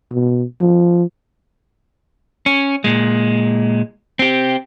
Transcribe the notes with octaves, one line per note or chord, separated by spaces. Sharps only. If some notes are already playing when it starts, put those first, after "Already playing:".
B2
F3
C#4
A#2 G#3
C4 G4